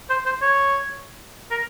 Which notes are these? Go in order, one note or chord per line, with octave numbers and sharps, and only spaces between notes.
C5
C5
C#5
A#4